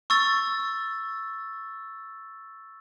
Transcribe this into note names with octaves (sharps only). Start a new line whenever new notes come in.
C#6 E6 A6